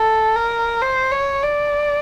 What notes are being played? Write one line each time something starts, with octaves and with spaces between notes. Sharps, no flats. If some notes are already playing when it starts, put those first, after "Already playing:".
Already playing: A4
A#4
C5
C#5
D5